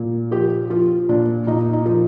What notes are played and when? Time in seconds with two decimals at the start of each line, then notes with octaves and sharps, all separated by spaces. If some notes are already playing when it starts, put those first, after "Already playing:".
Already playing: A#2
0.31 F3 G4
0.70 F3 F4
1.09 A#2 D4
1.47 A#2 D#4
1.73 D#4
1.86 F3